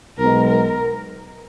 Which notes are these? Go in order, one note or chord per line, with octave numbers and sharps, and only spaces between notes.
B1 B2 G#3 B3 A#4
A#4